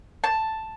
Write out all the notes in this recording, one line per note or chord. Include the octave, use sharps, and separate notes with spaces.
A5